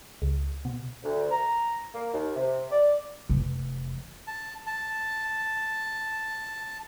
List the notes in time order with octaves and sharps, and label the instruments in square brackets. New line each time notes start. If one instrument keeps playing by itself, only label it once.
[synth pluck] C#2
B2
[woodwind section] D2
A#5
A#3
D#2
C3
D5
[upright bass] F1 E3
[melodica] A5
A5